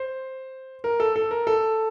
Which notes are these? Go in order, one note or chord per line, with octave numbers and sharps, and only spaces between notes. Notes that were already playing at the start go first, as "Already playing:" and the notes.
Already playing: C5
A#4
A4
A4
A#4
A4